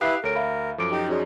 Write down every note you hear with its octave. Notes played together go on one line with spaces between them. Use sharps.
E4 G4 B4 E5 F5 D#6 F#6 C7
D2 A4 A#4 C#5 D7
E5 F5 B5
F#2 F3 A4 D6 D7
D#4 G4
C#4 D#4 F#4 G#4 D5